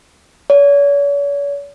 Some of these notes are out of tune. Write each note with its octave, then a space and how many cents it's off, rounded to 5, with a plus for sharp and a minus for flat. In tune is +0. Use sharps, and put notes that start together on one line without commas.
C#5 +45